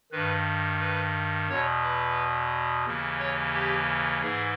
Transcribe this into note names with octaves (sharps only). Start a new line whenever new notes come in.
G2 D#3 B4
B4
E2 B2 C#5
B4
D#2 C#3 E3
C#5
G4
G#2 E3 G#4